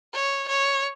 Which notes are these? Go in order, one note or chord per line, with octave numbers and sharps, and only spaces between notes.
C#5
C#5